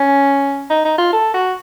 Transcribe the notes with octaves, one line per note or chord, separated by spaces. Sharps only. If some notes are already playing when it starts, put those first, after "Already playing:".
Already playing: C#4
D#4
D#4
F4
A4
F#4